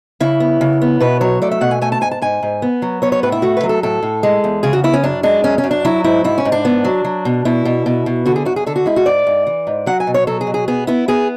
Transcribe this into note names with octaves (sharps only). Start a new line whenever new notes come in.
C#3 E4
B3
C#3
B3
B2 B4
F#3 C#5
A3 D5
E5
B2 F#5
G#5
A3 G#5
A5
G#2 G#5
A5
G#2 G#5
G#2
B3
F#3
B3 C#5
C#5
A2 B4
E4
A3 F#4
B4
F#3
A4
A2 A4
A2
G#3
E2
C#3 G#4
F#4
B3 E4
C#4
F#2 D4
G#3 D4
F#2 C#4
C#4
F#2
D4
F#3 E4
G#2 E4
G#2 E4
C#4
G#2
D4
B3
F#3
F#3
B2
B2 E4
B2
B2
B2
D3 F#4
G#4
F#2 F#4
G#4
D3 A4
F#4
G#3 E4
F#4
G#2 D5
G#2
E3
G#2
F#3 F#5
G#5
B2
C#5
F#3 A4
G#4
B2
G#4
B3 G#4
B3 E4
B3 G#4